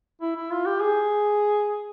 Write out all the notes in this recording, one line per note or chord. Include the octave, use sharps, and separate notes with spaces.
E4
E4
F4
G4
G#4